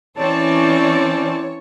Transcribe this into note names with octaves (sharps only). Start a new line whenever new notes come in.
E3 C4 C#4 C#5 D5 A5